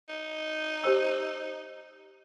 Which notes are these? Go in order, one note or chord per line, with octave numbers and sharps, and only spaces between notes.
D#4
G4 C5 E6